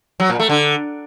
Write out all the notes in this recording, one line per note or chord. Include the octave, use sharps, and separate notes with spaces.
F#3
A#2
A3
D3